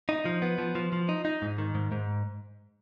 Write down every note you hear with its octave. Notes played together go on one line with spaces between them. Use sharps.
D#4
F3
B3
F3
F3
F3
D#4
D#4
G#2
D#3
G#2
G#2